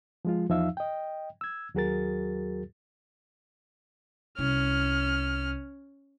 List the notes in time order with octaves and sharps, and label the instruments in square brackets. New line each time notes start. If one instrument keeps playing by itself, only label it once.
[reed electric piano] F3 G#3 F4
E2 F3 D#4 E5 F5 E6
D#5 G5
E6 G#6
D#2 F#3 F#4 G#4 A#4 A6
[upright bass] C2 [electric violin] C#4 F6